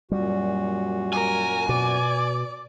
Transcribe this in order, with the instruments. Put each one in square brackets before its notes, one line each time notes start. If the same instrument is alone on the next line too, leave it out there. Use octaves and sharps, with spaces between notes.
[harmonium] F#2 A#2 F#4 [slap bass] G3
[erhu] A#4 [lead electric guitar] G#5
[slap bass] B2 [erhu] D5